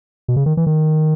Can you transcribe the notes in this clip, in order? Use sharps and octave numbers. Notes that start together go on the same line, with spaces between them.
B2
C#3
D#3
E3
D#3